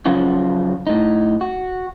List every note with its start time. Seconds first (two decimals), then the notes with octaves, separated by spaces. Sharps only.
0.06 F#2 C#3 F3 F4 F#4
0.87 A2 D#4
1.41 F#4